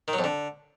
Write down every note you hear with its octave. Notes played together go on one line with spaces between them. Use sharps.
D#3
F#3
F2
D3